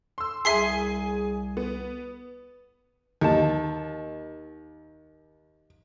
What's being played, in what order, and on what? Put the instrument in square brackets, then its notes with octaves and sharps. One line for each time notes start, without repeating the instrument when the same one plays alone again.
[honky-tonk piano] C6 E6
[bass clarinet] C2 [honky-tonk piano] G#4 G#5 [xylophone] E5 C6 C7
[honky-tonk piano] B3
[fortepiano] D#2 A5